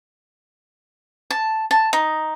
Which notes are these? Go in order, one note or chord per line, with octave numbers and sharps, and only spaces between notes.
A5
A5
D#4